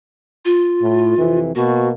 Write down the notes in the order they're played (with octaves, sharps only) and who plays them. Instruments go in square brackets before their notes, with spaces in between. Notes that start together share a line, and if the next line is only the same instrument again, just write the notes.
[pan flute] F4
[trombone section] A2
F2 C3 E3
[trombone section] B2 A#3 [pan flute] F#4